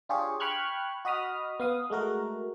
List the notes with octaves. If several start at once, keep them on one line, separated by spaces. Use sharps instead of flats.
D4 F4 G4 G#4 C#5
G5 B5 C#6 F6 F#6 G#6
F#4 D#5 B5 D#6 F6
B3 F5 D#6
G#3 A3 F#4 A#4